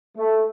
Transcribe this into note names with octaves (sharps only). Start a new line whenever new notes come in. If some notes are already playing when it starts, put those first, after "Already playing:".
A3